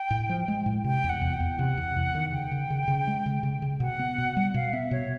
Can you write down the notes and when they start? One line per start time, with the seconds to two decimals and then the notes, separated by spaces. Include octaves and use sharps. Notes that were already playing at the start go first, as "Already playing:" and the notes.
Already playing: G5
0.10 A2
0.29 F3
0.48 G#3
0.66 A2
0.84 C3 G5
1.04 E2
1.09 F#5
1.21 E2
1.34 G5
1.40 E2
1.59 C3 F#5
1.78 E2
1.96 E2
2.15 D#3
2.32 C#3 G5
2.51 C#3
2.70 C#3
2.88 C#3
3.07 G#3
3.26 C#3
3.43 C#3
3.62 C#3
3.80 B2 F#5
3.99 B3
4.18 B2
4.36 G3
4.54 B2 F5
4.73 B3 E5
4.91 B2 C#5